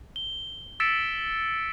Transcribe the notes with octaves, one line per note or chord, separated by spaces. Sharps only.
G7
E6 A6 B6 C#7 D7 E7